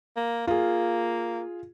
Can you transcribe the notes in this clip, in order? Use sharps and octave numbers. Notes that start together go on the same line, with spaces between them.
A#3
A#3 F4 G#4